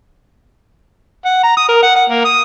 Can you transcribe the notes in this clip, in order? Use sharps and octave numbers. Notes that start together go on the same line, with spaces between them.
F#5
A#5
D#6
A#4
F#5
F#5
A#3
D#6